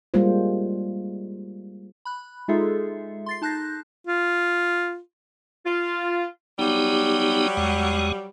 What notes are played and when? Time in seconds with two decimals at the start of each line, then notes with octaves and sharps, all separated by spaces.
0.14 G3 G#3 A#3 F4 C5
2.05 B5 F#6
2.48 G#3 D#4 F4 G#4 A4 E5
3.26 C6 A6 C7
3.42 D#4 A5 F#6 G6 A#6
4.07 F4
5.65 F4
6.59 F#3 G3 B3 D#4 G4
7.57 E2 G#3 F#5